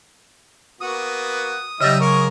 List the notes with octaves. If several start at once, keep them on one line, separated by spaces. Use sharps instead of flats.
A#3 B3 F#4 D#6
C#3 F#3 G3 D#4 D#5 E5
G#3 A#3 A#4 C#6